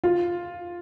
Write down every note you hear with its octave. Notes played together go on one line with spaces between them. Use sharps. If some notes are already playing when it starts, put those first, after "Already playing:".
F4